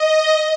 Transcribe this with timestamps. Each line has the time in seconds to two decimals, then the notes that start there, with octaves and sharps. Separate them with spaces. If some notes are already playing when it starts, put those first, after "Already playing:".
Already playing: D#5